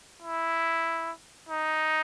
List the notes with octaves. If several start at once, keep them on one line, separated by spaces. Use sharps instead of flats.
E4
D#4